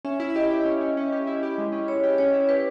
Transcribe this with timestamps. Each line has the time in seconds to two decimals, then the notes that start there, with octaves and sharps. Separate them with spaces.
0.05 C#4 E5
0.20 E4
0.30 E5
0.35 G4 D#5
0.50 G4
0.65 C#4
0.81 C#4
0.97 C#4
1.12 G4
1.27 E4
1.43 G4
1.58 G#3
1.72 C#4
1.88 E4 C#5
2.04 G4
2.18 C#4 C#5
2.33 E4
2.49 G4 B4